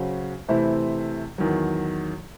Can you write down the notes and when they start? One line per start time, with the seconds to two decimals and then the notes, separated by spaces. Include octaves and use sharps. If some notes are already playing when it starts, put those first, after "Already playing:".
Already playing: C#3 F#3 C#4 F#4 C5
0.48 C3 E3 A3 C4 E4
1.38 E2 D#3 F#3